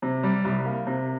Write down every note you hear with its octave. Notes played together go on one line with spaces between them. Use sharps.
C3
G3
C2
A#3
C3